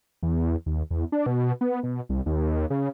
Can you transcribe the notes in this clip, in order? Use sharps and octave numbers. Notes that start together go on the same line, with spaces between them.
E2
D#2
E2
D4
B2
B3
B2
C2
D#2
C#3